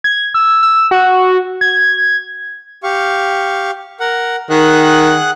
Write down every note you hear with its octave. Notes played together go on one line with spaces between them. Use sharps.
G#6
E6
E6
F#4
G#6
G4 F5 C#6
A#4 F#5
D#3 G#4 F#5 F#6